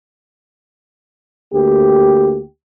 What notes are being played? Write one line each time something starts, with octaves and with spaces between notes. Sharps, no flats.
D2 A#3 G4